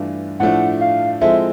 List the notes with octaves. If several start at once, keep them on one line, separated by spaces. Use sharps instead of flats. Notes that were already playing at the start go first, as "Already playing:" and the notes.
Already playing: G2 E3 A3 D4 F4
A2 F3 A3 D4 F#5
F5
F3 G#3 C4 E4 A4 E5